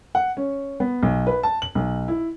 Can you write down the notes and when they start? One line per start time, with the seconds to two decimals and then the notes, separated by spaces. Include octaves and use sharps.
0.15 F#5
0.37 C#4
0.80 B3
1.03 B1
1.27 B4
1.43 A5
1.62 F#7
1.75 B1
2.08 E4